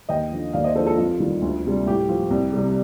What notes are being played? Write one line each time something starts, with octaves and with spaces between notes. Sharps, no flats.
D#2 D#5 G5
D3 F3
D#2 D5 F5
C5 D#5
D3 F3 A4 C5
F4 A4
F2 F4
D#3 G3
D2
C3 G3
A2 G4
F3
C2
C3 G3